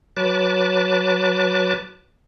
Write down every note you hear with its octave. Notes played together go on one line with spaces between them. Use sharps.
F#3 B4 A5 D6